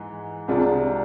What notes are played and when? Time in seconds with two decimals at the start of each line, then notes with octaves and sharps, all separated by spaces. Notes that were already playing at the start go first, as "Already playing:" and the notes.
Already playing: G#2 E3
0.48 C2 C3 G#3 D4 F4